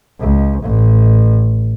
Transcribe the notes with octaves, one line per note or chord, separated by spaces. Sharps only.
C#2
A1